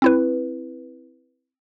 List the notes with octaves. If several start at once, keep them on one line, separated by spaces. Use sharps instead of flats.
C4 E4 B4